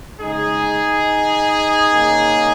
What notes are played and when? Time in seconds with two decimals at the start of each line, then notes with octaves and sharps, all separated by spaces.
0.19 C#3 G#3 D#4 G#4
1.93 C#3 A#3